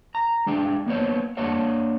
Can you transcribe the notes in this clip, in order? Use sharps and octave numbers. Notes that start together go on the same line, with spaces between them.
A#5
G#3 D4 G5
A#3 B3 C5 C#5
A#3 D4 C#5 F#5